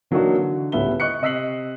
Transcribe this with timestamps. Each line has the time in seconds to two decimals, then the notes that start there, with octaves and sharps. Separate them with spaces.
0.11 E3 F#3 A#3 D4 D#4 F#4
0.37 D3
0.72 C#2 A2 G3 B3 E5 G7
1.00 D#5 C#6 F#6 C#7
1.22 C3 D#5 E6 B6 C7 F#7